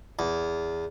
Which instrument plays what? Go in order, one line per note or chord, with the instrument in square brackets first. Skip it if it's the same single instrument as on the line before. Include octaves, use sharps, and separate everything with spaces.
[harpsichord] E2